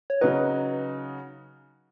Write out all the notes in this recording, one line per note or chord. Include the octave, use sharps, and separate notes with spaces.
C#5
C#3 F#3 D#4 F#4 B4